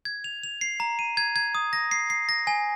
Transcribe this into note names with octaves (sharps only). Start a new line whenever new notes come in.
G#6
F7
F7
C7
A#5
D#7
G#6
G#6
D#6
A#6
C7
C7
A#6
G#5